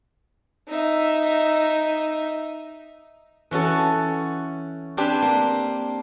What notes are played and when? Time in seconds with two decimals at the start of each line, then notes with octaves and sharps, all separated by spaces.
0.68 D#4 E5
3.51 E3 C#4 F#4 A4
4.97 C4 D4 G4 B4 G#5
5.22 A#3